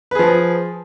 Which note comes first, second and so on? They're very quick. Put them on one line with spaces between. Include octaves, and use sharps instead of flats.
B4 G#4 F3